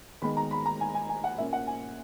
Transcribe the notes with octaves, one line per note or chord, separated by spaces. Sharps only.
D#3 G#3 B3 B5
A#5
B5
A#5
G#5
G#5
G#5
F#5
A#2 A#3 C#4 E5
F#5
G#5